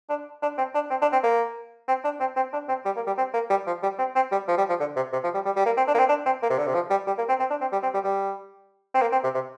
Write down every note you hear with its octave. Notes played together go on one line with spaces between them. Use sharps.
D4
D4
C4
D4
C4
D4
C4
A#3
C4
D4
C4
C4
D4
C4
G3
A#3
G3
C4
A#3
G3
F3
G3
C4
C4
G3
F3
G3
F3
D3
C3
C3
F3
G3
G3
G3
A#3
C4
D4
A#3
C4
D4
C4
A#3
C3
D3
C3
F3
G3
G3
A#3
C4
C4
D4
C4
G3
C4
G3
G3
C4
A#3
C4
C3
C3